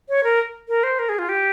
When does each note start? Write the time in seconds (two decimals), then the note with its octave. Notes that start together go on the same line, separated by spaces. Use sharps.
0.09 C#5
0.24 A#4
0.69 A#4
0.83 C5
0.99 A#4
1.09 G#4
1.19 F4
1.29 G4